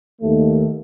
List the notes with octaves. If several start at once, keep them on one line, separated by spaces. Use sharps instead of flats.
D#2 A3